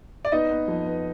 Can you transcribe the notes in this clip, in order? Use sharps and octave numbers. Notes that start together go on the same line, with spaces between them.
D5
B3 D#4 D#5
B3
F2
B3